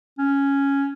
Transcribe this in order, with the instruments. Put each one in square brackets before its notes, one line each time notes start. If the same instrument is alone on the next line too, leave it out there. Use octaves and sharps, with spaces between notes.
[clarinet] C#4